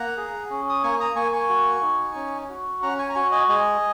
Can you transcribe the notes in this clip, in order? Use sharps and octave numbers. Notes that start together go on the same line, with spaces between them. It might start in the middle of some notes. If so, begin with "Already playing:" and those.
Already playing: A#3 F#5 A#5
G#4
C#4
D#6
A#3 G#5 C#6
A#5 D#6
A#3 G#5 C#6
G#5 C#6
F#4
D#4
C#4
F#4
C#4 F#5 A#5
G#5 C#6
A#5
F#4 G#5 C#6
D#5 G#5
G#3 D#5 G#5